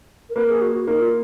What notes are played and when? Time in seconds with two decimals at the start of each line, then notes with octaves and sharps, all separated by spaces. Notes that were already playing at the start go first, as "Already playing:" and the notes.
0.30 A#4
0.35 A#3 B4
0.49 G#4
0.61 F#4
0.75 F#4
0.87 A#3 D#4
1.00 F4